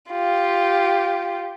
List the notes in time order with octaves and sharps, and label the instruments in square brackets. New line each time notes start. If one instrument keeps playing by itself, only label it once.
[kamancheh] F4 G4